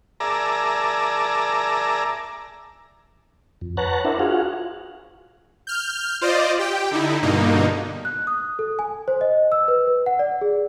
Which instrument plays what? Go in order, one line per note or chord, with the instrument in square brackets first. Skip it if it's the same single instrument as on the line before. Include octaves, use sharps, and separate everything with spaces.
[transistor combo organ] G#4 A#4 D5 E5 A5 A#5
[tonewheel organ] F2
B4 C#5 F#5 A5 A#5 F#6
D4 E4 A#4 C5 E5 F#5
F4 F#4 G#4 F5 F#5
[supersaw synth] F6 G6
F4 C5 D5 D#5
G4 G5
D3 D#4 E4
G2 B2 D3 A#3 D#4
[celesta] F#6
D#6
A4
G#5
C5
D#5
E6
B4
B4
F#5
D5
G#4